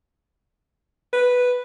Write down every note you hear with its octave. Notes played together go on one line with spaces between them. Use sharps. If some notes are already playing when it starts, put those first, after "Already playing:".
B4